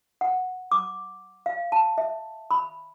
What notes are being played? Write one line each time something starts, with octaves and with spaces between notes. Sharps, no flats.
F#5
D6
F5
A5
E5
B5